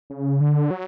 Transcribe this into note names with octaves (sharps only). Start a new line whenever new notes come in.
C#3
D3
F#3